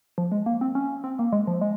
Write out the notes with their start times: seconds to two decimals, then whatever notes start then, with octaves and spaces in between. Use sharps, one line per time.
0.18 F3
0.32 G#3
0.46 A#3
0.61 C4
0.75 C#4
1.04 C4
1.19 A#3
1.32 G#3
1.47 F3
1.61 G#3